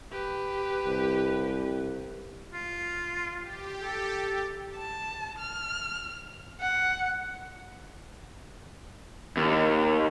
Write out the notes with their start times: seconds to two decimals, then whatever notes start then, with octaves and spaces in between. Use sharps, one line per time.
0.11 G4 B4
0.86 C2
2.53 F4
3.38 G4
3.81 A4
4.76 A5
5.38 F6
6.61 F#5
9.37 D#2